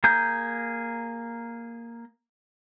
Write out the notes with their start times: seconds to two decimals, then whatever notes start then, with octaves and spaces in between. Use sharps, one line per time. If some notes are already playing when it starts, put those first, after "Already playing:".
0.04 A#3 G#4 A#5 G6